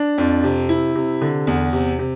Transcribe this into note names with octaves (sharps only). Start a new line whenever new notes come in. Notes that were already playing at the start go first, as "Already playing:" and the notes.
Already playing: D4
F2
C3
E4
C3
D3
E2
C3
C3